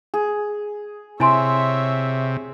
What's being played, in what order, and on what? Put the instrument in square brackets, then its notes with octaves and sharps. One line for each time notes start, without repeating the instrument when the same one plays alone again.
[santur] G#4
[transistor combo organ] C3 [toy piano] E4 G#5 C6 [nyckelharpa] C#5 E5